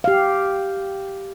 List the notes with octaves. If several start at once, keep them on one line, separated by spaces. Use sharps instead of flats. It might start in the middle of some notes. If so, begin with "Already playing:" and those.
G4 F5